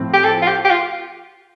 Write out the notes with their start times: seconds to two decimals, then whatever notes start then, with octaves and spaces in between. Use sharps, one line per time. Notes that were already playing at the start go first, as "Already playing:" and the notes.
Already playing: A2 F3 C4
0.13 G4
0.24 A4
0.42 F4
0.47 G4
0.64 G4
0.70 F4